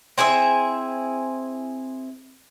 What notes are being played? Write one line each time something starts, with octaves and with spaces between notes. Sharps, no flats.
C4 E4 G#4 E5